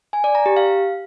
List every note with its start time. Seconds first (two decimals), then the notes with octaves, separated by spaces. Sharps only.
0.13 G#5
0.24 D5
0.35 A#5
0.46 G4
0.57 F5